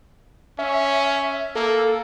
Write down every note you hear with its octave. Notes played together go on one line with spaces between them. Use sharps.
C#4 E5
A#3 A4